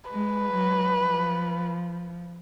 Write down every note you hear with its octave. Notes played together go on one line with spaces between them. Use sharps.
G#3 B4
F#3
F3